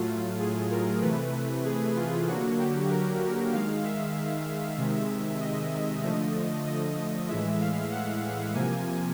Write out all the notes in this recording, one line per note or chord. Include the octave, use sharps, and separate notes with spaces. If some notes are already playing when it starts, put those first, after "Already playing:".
Already playing: A2 F#3 A3 F4
G#4
A#4
C3 E3 A3 B4
G#4
F4
D3 F#3 A#3 F#4
G4
A#4
D#3 G#3 F5
E5
C3 D#3 G#3
D#5
D3 F3 A3
D#5
A2 E3 G#3 E5
F5
F#5
C3 F3 A#3 G#5